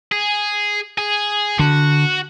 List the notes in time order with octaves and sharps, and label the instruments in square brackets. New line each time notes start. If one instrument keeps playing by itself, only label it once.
[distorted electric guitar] G#4
G#4
[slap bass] D3 [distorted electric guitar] F#4